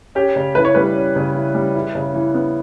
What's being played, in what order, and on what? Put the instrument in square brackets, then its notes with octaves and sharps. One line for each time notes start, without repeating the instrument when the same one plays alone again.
[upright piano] C#4 [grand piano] G4
[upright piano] C#3
[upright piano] E3 [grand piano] B4
[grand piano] C#5
[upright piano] G3 [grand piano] B4
[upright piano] C#4
C#3
E3
G3
E4
C#3
E3
B3